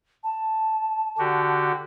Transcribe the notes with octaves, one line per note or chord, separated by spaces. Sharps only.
A5
D3 F#4 G4